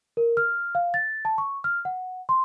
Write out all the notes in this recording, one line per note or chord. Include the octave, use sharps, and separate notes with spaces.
A#4
F6
F5
A6
A5
C#6
F6
F#5
C6